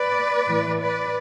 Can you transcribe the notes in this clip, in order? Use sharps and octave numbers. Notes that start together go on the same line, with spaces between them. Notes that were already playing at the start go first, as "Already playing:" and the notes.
Already playing: B4 D5
A2 E3
B4 D5